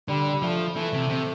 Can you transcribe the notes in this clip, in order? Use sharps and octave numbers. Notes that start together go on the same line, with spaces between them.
D3 G3
G3
F3 A3
E3 A3
C3
C3